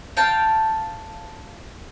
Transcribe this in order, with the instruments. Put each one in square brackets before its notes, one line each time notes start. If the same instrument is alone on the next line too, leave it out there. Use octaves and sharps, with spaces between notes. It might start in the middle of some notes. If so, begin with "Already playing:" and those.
[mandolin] F5 G5 A5